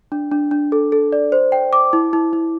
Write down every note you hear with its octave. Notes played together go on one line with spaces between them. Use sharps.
D4
D4
D4
A4
A4
D5
C5
G5
D6
E4
E4
E4